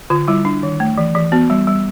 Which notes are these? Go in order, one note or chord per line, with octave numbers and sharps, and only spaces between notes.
D3 F4
G3 E4
D4
D#3
A3
E3
E3
B3 F#4
G3
G3